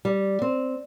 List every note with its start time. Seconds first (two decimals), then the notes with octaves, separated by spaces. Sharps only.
0.05 G3
0.42 C4